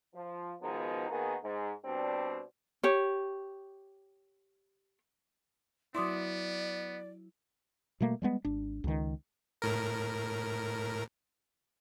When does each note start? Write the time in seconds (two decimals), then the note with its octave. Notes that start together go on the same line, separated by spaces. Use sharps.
0.14 F3
0.61 B2 D#3 F3 G#3 B3 D#4
1.10 D#3 A#3 B3 D#4 F#4 G#4
1.43 G#2
1.85 B2 G3 C4 D4
2.84 G4 C#5
5.95 F#3 B3 E4 D5 C6 D6 D#6
8.00 B2 G3 A3 A#3
8.22 G3 G#3 B3
8.45 G#1 D4
8.84 C#2 D#3
9.62 A2 A#4